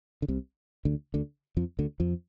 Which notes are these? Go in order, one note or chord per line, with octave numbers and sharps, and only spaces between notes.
D3
C2 C3
D2 D3
D2 D3
F2 F3
D2 D3
F2 F3